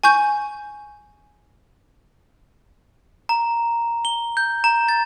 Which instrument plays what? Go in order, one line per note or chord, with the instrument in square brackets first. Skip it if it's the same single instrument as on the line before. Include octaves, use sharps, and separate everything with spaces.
[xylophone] G#5 C#6 G6
[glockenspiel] A#5
G7
G6
A#5
A6